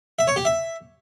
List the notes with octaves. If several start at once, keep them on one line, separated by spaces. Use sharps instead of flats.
E5
C#5
G4
E5